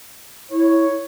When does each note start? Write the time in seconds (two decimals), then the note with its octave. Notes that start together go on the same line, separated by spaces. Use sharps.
0.51 E4 C#5